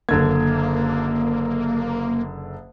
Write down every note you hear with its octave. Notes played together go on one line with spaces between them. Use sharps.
F#1 D3 A#3 G#6